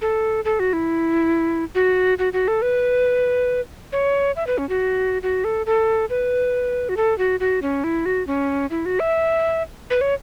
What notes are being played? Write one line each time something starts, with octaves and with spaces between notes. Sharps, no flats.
A4
A4
F#4
E4
F#4
F#4
F#4
A4
B4
C#5
E5
B4
C#4
F#4
F#4
A4
A4
B4
F#4
A4
F#4
F#4
C#4
E4
F#4
C#4
E4
F#4
E5
B4
C#5